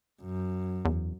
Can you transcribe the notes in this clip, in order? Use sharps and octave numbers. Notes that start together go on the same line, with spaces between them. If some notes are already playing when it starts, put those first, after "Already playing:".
F#2
E2